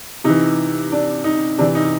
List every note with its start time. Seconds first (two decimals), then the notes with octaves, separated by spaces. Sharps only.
0.24 C3 E3 D#4
0.92 D4
1.24 D#4
1.58 C3 E3 D4
1.75 D#4